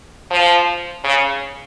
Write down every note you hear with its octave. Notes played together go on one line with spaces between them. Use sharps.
F3
C#3